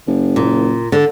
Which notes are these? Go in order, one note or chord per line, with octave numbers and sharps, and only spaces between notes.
F#1
A#2
D3